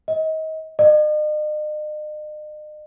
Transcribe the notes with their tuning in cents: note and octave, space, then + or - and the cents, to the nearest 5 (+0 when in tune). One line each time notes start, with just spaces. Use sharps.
D#5 +30
D#5 -45